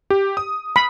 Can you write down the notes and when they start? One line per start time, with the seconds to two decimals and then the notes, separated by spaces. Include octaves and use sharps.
0.10 G4
0.37 D#6
0.76 B5